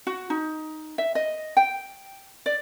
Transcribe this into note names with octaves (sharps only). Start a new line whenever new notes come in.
F#4
D#4
E5
D#5
G5
D5